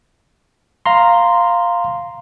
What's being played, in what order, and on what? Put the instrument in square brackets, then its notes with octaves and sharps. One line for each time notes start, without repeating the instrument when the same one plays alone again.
[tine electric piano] F5 A#5 C6